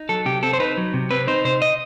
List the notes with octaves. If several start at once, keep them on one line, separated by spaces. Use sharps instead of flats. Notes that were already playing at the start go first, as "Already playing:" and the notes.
Already playing: D#4
F#3 A4
C3 G4
C4 A4
C5
D#4 B4
F#3
C3
C4 B4
D#4 C5
C3 C5
D#5